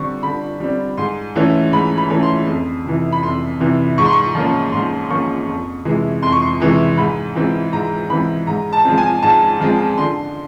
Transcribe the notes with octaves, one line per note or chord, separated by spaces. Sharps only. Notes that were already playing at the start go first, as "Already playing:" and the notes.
Already playing: D3 G3 C4 C#6
D3 B5
G3 C4
G#2 C6
E3 A3 C#4
G#2 B5
B5
E3 A3 C#4
C6
F2
C3 E3
B5
F2 C6
C3 E3
G#2 C#6
C6
C#6
F3 A#3 C#4
G#2 C6
F3 A#3 C#4 C#6
F2
C3 E3 G#3
F2 C6
C#6
C6
C3 E3 G#3
G#2 B5
E3 G#3 C4
G#2 A#5
E3 G#3 C4 B5
G#2 A#5
A5
F3 G#3 C4
G#5
G#2 A5
F3 G#3 C4
D3 C6